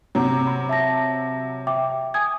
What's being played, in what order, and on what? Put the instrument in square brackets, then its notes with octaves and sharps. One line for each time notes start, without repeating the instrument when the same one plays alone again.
[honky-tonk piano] C3 F#3 [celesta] A#5
[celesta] B5
E5 A5 A#6
E5 G5 D6
G#5 D#6 G#6